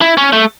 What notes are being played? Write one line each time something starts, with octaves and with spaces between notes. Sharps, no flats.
E4
C#4
A3